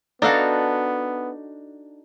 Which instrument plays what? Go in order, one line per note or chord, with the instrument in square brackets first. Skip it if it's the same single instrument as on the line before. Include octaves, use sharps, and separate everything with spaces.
[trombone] B3 [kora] D4 A4 F5 [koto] D#4 F#4